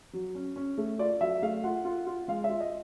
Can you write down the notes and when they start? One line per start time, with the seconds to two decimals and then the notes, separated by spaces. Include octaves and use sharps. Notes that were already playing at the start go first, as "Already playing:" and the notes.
0.13 F#3
0.35 C#4
0.56 C#4
0.78 A3
0.99 F4 D5
1.21 F#3 E5
1.42 A3 F5
1.64 F4 F#5
1.85 F4
2.07 F4
2.28 G#3 F5
2.44 E5
2.50 F4
2.60 D#5